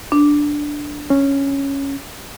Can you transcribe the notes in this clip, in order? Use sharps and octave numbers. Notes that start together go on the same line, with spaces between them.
D4
C#4